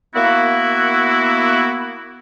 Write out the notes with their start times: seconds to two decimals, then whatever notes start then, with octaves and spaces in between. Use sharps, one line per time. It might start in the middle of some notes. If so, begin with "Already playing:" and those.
0.15 A#3 B3 E4 F#4